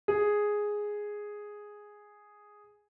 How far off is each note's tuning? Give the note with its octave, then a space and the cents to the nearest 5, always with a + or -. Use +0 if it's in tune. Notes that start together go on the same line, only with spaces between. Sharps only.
G#4 +0